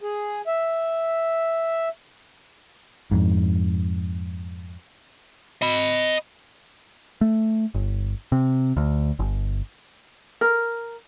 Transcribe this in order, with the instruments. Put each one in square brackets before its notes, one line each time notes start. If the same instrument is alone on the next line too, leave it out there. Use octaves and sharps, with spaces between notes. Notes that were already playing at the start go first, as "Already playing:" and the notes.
[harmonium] G#4
E5
[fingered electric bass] F2 G#2
[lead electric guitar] D#5 B5
[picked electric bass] A3
G1
C3
D2
G1
[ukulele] A#4